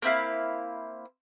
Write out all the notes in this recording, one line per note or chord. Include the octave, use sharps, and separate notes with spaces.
A#3 C4 E4 F5